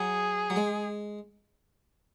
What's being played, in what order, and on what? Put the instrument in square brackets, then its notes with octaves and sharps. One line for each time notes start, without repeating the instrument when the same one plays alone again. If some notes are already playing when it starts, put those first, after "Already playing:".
Already playing: [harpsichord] F#3 [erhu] G#4
[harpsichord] F#3
G#3